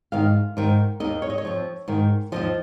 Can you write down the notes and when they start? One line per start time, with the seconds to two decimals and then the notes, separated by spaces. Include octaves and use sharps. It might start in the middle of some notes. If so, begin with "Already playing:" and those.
0.12 G#2 D#3 F5
0.57 G#2 D#3
1.00 D#2 D#3 D#5
1.22 C#5
1.30 D#5
1.38 C#5
1.45 F2 F3
1.88 G#2 D#3
2.32 D#2 C#3 F3 D#5